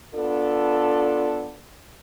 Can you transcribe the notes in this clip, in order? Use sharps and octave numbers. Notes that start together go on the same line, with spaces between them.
B3 D4 F4 A4